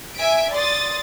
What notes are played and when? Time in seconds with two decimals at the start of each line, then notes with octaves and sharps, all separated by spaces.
0.17 E5 G#5 B6 D7
0.54 D5 C6 D#6 A6